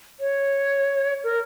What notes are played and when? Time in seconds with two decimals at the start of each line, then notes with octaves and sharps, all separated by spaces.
0.20 C#5
1.24 A#4